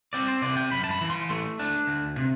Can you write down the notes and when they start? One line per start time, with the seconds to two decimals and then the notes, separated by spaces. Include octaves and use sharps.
0.13 C4 D5
0.28 C5
0.42 C3 D5
0.57 G5
0.72 F#2 B5
0.84 A5
0.91 B5
1.01 E3
1.10 C6
1.30 A3
1.59 D4
1.87 D2
2.18 C3